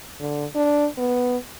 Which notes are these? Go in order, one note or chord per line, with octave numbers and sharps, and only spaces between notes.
D3
D4
B3